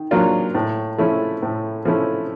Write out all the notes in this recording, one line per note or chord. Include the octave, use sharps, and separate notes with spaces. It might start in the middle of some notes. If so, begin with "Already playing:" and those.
Already playing: D#3
F#3 A#3 D4 F4
A2
F3 A3 C#4 E4
A2
F3 A3 C#4 E4